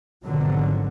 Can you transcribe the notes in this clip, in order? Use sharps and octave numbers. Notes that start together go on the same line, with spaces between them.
G#1 G#2 B2 D3 F3 F#3